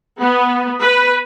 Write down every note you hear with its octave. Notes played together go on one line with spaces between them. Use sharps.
B3
B4